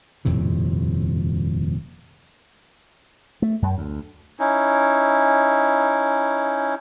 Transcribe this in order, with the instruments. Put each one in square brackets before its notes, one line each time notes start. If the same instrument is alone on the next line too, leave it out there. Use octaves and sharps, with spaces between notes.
[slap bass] D#1 F2 A2 C3
A3
F#2
D2
[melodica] C#4 D#4 E4